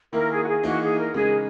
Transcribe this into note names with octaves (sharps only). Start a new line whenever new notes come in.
D#3 A#3 E4 A#4
G#4
F#4
G#4
E3 A#3 D#4 F#4
G#4
A#4
C#3 G#3 D#4 G#4